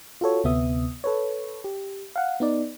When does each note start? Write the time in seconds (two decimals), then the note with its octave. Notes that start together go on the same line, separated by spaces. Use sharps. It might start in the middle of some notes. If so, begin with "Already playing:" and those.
0.21 F4 F#4 A4 C#5
0.44 D2 C3 B3 E5 D#6
1.04 A4 B4 C#5
1.64 G4
2.16 F5 F#5
2.40 B3 D#4 D5